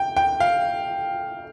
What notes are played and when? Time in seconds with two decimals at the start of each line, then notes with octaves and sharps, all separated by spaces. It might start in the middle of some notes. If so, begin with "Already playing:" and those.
Already playing: G5
0.17 G5
0.40 F5